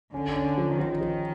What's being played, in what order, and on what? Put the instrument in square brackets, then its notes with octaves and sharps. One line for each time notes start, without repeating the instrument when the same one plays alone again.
[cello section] D3 [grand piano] C#4
[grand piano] C#4
F3
[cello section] D#3 [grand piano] F3
[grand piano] F3